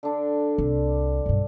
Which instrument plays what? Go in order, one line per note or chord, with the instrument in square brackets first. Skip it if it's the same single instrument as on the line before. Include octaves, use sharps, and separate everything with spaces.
[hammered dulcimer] D3 D4
[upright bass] C2
B1 G2